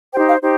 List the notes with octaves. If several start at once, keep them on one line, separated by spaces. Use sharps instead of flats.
D#4 G4 C5 G5
F5
D#4 G4 C5